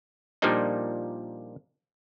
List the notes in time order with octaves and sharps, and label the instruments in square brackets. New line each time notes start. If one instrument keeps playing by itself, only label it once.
[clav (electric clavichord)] A#2 F3 G3 A#3 D4 D#4